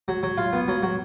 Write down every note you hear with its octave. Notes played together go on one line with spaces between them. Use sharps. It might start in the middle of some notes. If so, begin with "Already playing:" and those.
F#3
F#3
F4
B3
F#3
F#3